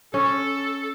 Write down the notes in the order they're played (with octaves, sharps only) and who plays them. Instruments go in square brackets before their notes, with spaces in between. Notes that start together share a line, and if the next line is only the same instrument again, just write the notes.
[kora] C#4 [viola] A4